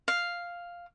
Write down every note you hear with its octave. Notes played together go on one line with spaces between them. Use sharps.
F5